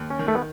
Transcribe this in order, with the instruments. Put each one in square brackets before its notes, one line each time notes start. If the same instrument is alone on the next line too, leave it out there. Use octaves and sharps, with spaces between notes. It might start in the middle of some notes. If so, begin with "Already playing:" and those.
Already playing: [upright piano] D#2
[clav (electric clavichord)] C#4
[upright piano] D#3
[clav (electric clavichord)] A3
B3